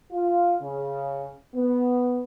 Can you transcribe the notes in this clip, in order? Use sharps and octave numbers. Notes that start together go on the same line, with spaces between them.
F4
C#3
B3